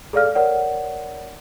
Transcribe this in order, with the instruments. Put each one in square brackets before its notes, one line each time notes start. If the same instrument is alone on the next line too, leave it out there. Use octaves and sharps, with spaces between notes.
[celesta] G#4 A4 D5 F5 F6
A#4 C#5 D5 F#5